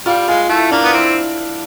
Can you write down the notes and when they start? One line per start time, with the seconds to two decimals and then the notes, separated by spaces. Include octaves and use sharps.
0.05 G3 F4
0.28 G#3 F4
0.49 A3 E4
0.71 A#3 D4
0.84 B3
0.93 C4 E4